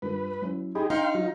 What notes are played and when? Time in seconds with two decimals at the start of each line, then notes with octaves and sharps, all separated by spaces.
0.02 G2 F4 A#4 B4
0.42 F#3 C#4 E4
0.75 D#4 G4 G#4 B5
0.90 D4 D#4 F5 G5 C6
1.15 F#3 F4